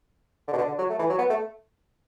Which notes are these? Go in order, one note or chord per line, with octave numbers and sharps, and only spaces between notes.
D3
B2
D3
D3
F#3
A3
E3
F#3
B3
A3